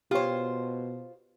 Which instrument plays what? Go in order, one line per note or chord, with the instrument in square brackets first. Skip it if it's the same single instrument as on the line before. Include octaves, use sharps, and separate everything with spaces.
[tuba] B2 [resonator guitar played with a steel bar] F4 C5 [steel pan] G4 C#5